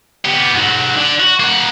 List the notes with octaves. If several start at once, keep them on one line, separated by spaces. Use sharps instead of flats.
B3 G4
G#2 F#3
D3
F#4
A#3 F#5